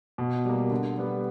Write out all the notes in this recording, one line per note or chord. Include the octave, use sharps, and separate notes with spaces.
B2
G3 A#3
D3
G3 B3